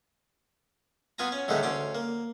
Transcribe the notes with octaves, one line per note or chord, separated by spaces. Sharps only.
B3 F4 G#5 A#5
C#4
A2 D3 D#3 G#3 A3 C#4
D2 C#4 C6 D6
A#3